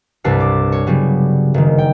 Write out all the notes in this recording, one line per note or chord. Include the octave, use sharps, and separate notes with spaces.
C2 G2 C3 D4 B4 C7
D6
C#5
C#3 F#3 G3 B3
F#1 D#3
G5